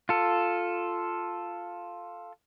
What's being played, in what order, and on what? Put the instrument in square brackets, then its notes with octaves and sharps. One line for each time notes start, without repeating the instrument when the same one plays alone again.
[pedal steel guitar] F4 A4